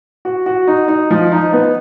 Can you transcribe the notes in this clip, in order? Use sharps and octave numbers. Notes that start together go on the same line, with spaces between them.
F#4
F#4
D#4
D#4
F3
D#4
B3